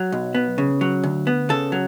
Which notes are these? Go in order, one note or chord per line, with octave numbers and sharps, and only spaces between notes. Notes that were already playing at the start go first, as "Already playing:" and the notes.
Already playing: F#3
B1
B3
C#3
F#3
D2
B3
C#3 A4
F#3